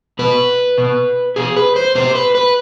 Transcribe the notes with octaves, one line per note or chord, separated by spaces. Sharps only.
B2 B4
B2
B2 G#4
B4
C5
B2 C5
B4
B4